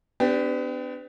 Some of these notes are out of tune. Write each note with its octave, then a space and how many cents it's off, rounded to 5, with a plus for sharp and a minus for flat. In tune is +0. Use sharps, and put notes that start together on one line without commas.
B3 +40 D4 +0 G4 +0